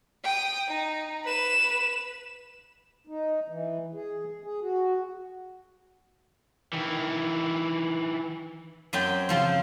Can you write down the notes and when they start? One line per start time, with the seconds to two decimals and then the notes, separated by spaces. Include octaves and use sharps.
0.24 G5 D#6
0.68 D#4
1.24 B4 E7
3.07 D#4
3.48 E3
3.94 G#4
4.44 G#4
4.62 F#4
6.73 D#3 E3
8.93 F#2 F#3 C4 G5
9.29 C#3 F3 C4